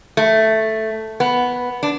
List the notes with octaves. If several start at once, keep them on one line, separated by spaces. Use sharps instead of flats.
A3
B3
D4